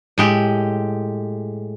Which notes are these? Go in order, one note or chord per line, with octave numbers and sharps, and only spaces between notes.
A2 G#3 G4